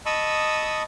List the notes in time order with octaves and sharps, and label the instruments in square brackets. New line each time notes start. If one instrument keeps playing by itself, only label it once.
[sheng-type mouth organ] D#5 A5 B5 C#6 D#6 E6